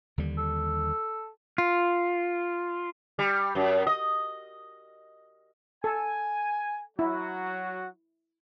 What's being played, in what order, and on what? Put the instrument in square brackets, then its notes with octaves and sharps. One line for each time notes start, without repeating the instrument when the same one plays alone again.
[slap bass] D#2 D3 G3
[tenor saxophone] A4
[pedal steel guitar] F4
[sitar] G3
F#2
D#5
[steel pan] A4 [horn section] G#5
[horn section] F#3 F#4 [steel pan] E4